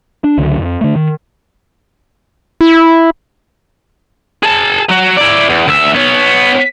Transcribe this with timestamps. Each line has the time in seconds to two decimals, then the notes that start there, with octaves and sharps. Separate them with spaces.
0.24 D4
0.38 C#2 D3 F3 F#3
0.59 F2
0.81 D3 A3
0.96 D#3
2.61 E4
4.43 G#4 A5
4.89 F#3 F#4
5.17 E4 D5
5.49 E2
5.68 D2 E5
5.95 B3 C#5